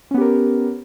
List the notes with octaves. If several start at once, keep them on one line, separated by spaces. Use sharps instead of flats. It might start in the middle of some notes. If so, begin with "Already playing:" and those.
B3 C#4 G4 A#4